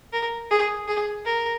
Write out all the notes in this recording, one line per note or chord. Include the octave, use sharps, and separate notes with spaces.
A#4
G#4
G#4
A#4